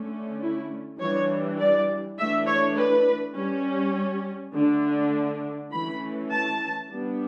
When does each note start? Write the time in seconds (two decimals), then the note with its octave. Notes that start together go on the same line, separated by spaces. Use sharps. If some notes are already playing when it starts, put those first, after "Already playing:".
Already playing: D3 A3 C#4
0.41 E4
1.00 E3 G3 D4 C#5
1.59 D5
2.18 E3 A3 D4 E5
2.47 C#5
2.76 B4
3.36 G3 C#4
4.54 D3 A3 D4
5.72 E3 A3 C#4 B5
6.32 A5
6.90 G3 B3 D4